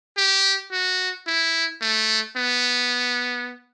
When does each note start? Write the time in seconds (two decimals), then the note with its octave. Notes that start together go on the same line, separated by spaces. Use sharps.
0.17 G4
0.72 F#4
1.27 E4
1.82 A3
2.37 B3